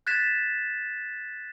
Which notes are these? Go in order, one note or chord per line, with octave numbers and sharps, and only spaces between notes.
F#6 G#6 A6 B6 E7